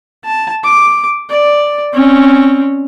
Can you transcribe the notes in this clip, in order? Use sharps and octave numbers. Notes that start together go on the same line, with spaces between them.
A5
D6
D5
C4 C#4